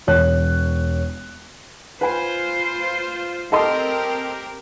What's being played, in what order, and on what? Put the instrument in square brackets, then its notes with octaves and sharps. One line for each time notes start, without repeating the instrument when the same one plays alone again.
[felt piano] E1 C#5 F#6
[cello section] F4 C5 [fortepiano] B4 G#5
[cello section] C4 G4 A#4 [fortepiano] A4 D#5 C6